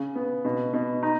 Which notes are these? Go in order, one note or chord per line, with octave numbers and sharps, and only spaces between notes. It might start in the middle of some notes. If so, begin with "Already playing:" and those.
Already playing: C#3
B3
B2
B2
D#4